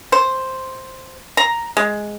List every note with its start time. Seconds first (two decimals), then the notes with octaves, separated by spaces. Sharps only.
0.12 C5
1.37 A#5
1.77 G#3